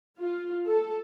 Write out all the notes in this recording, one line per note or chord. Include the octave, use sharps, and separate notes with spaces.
F4
A4